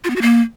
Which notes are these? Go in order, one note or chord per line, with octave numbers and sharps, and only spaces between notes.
F4
B3
F#4
A#3